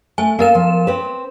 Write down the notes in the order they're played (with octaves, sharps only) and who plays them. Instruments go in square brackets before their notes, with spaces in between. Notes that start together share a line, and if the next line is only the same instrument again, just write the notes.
[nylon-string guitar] A3 [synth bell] G#5
[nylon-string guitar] A#3 F5 [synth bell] B3 A#4 E7
[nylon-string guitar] F3
C4 B4